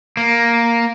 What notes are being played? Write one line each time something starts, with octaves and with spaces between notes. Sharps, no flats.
A#3